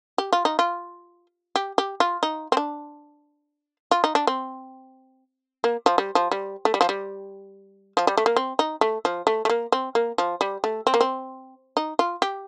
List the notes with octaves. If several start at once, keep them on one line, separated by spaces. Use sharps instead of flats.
G4
F4
D#4
F4
G4
G4
F4
D#4
C4
D4
F4
D#4
D4
C4
A#3
F3
G3
F3
G3
A3
G3
F3
G3
F3
G3
A3
A#3
C4
D#4
A3
F3
A3
A3
A#3
C4
A#3
F3
G3
A3
C4
A#3
C4
D#4
F4
G4